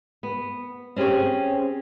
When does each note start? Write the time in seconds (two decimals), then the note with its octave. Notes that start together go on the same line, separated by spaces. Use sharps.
0.23 B3
0.96 C4 C#4 G4 G#4 C#5